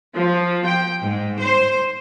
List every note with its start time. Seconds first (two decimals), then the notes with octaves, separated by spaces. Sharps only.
0.16 F3
0.66 G5
1.03 G#2
1.40 C5